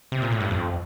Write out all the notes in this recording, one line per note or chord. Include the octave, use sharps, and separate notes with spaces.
C3
A#2
A2
G2
F2